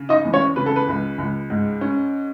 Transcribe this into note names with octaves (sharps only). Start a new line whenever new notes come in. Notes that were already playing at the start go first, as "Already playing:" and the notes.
Already playing: C#3
D#4 D#5
E2
C#4 C#5
C#3 B4
A4
B4
C#2
C#2
G#2
C#4